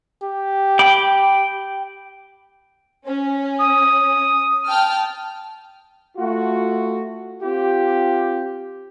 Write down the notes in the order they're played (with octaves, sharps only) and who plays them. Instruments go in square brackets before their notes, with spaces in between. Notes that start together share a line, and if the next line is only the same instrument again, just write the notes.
[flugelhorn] G4
[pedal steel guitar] G5 B5 D6
[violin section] C#4
[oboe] D#6
[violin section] G5 A5 F6
[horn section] A3 F4 F#4
C4 F4 G4